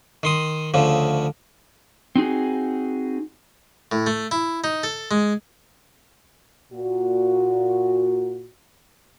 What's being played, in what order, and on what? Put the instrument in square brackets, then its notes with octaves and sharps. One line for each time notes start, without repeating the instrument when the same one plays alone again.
[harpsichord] D#3 C6 D#6
D2 C#3 F3
[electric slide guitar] C4 D#4 F#4 G#4
[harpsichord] A2
A3
E4
D#4
A4
G#3
[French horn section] A#2 F#4